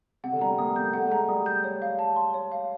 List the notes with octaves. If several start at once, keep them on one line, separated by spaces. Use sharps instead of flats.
C3 F#5
D3
G3 A#5
A3
A#3 D#6
A#3 G6
A3 F#5
G3
G#3 A#5
G3 D#6
G6
C#5
F5
A5
C6
C#5
F5